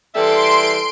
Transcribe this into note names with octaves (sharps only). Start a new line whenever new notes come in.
E3 G3 A4 E5 C6 D7